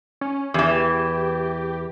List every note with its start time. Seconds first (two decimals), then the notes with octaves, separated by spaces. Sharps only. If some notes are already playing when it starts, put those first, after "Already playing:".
0.21 C#4
0.54 E2 E3 G4